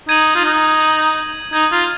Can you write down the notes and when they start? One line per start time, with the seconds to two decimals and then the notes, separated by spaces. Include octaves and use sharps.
0.08 D#4 G#6 D#7 F#7
0.35 F4
0.44 D#4
0.80 G#6 D#7 F#7
1.53 D#4 G#6 D#7 F#7
1.72 F4